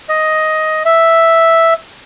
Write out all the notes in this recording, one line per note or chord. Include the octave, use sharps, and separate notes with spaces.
D#5
E5